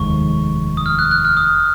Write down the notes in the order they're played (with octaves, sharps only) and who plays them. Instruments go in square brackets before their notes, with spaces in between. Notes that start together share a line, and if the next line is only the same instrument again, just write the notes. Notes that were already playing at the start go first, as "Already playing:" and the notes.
Already playing: [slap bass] F1 D#2 D#3 G#3 [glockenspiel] C#6
[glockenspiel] D#6
F6
F#6
F#6
F6
D#6